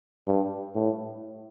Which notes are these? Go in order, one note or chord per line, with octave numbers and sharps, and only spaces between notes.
G2
A2